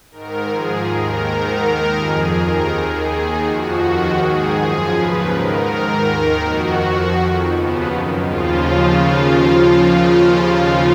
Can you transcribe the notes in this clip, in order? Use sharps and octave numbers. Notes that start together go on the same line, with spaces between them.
G#2 D#3 A#4
G#2 F3 G#4
D#2 D#3 A#4
G#2 D#3 A#4
D#2 D#3 A#4
F2 F3 G#4
D#2 D#3 A#4
D#2 D#3 G#4
D#2 D#3
F2 F3 F#4
D#2 D#3
G#2 D#3 G#4
F#2 F3 G#4
D#2 C#3 F3 B4
G#2 D#3 A#4
G#2 D#3 A#4
D#2 D#3 A#4
F2 D#3 F#4
F2 F3
F2 D#3
D#2 C#3 F3 B3
F#2 D#3
D#2 C#3 F3 F4